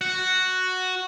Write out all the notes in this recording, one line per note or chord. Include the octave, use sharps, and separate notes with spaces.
F#4